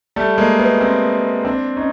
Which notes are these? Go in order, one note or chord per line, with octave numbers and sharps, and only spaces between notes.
G3 A3
G#3 A#3
A3 B3
A#3 C4
C4 D4
C#4 D#4